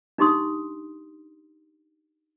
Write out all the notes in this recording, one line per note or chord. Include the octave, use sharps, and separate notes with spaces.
D4 D#4 G4 C6 D#6